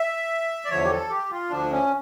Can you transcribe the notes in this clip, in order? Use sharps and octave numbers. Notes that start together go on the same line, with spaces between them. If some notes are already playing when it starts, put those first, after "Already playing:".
Already playing: E5
D5
E2 D3 F3 C#5
G4
A4
G4
F4
D2 D3 F3 D4
C#4